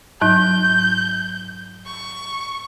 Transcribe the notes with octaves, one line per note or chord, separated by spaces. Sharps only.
G#2 F#3 D#4 G6
C#6